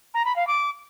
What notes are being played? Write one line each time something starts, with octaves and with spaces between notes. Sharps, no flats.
A#5
B5
F5
D6